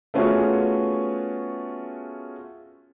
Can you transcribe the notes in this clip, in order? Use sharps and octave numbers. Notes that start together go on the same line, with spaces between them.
A3 B3 C#4 F4 F#4 G#4